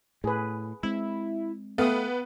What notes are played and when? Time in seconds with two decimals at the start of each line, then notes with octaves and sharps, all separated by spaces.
0.24 A2 G#4 B4
0.83 G#3 C4 E4
1.78 A3 B3 F5 G5 D#6